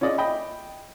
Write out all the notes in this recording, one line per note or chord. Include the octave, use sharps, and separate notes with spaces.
C#4 F4 G#4 D5 D#5
D#5 G5 B5